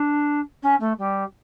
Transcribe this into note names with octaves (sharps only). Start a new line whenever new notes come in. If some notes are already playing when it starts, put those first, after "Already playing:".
Already playing: D4
C#4
A3
G3